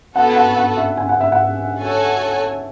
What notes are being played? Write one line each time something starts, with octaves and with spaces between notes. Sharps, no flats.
B3 F#4 A4 F#5
F#5
F#5
E5
G#5
F#5
E5
F#5
F#4 A4 C#5 G#5